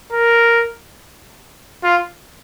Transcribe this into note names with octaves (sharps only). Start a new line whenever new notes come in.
A#4
F4